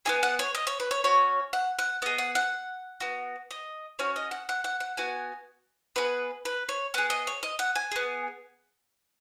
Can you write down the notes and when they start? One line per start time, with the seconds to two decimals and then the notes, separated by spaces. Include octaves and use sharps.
0.05 B3 D#4 G#4 G#5
0.23 F#5
0.39 C#5
0.55 D#5
0.67 C#5
0.80 B4
0.91 C#5
1.04 C#4 F#4 C#5
1.53 F#5
1.79 F#5
2.02 B3 G#4 D#5
2.18 F#5
2.35 F#5
3.00 B3 F#4
3.51 D#5
3.99 C#4 F#4 C#5
4.16 D#5
4.31 F#5
4.49 F#5
4.64 F#5
4.80 F#5
4.97 B3 F#4 G#5
5.96 B3 D#4 G#4 B4
6.45 B4
6.69 C#5
6.94 B3 G#4 F#5
7.10 D#5
7.27 C#5
7.43 D#5
7.59 F#5
7.76 G#5
7.92 B3 G#4